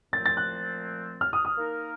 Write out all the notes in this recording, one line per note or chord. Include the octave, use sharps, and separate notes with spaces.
A#2 F3 A3 C4 A6
A6
F#6
F6
D#6
D#6
A#3 D#4 A#4